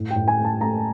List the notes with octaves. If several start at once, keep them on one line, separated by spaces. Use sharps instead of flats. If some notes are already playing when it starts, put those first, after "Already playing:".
Already playing: A2
G5
A2
G#5
A3
A5
A3 A#5